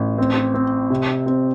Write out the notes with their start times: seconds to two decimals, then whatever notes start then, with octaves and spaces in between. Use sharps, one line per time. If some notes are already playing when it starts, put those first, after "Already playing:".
Already playing: A1
0.18 C4
0.54 C4
0.90 C3
1.26 C4